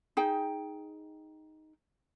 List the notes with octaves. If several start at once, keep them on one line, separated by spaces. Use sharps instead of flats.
D#4 G#4 G5